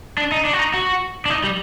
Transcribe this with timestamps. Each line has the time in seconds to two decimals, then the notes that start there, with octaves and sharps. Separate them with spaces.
0.18 D4
0.32 D#4
0.45 D4
0.53 F#4
0.59 D#4
0.74 F#4
1.26 D4
1.30 D#4
1.44 G3